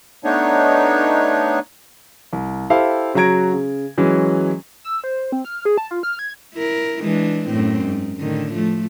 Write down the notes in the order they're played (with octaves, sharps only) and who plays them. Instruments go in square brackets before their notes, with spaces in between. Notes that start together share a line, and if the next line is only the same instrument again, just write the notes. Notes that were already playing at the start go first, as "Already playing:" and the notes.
[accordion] A3 B3 D4 D#4 C#5
[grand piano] C2
E4 G4 A4 C5 E5 F5
C#3 F#3 F#4 A#5 G#6 D7
C#3
E3 F#3 G#3 C#4
[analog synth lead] E6
C5
C4
F6
G#4
A5
F4
F6
G#6
[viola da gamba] E4 A#4
E3 G#3 D4
F#2 A2 C4
G#2
A2 D3 D#3
F3 A3